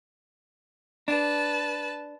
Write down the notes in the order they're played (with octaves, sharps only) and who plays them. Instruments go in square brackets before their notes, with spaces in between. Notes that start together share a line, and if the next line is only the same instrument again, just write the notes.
[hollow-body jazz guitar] D4 [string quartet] B4 A5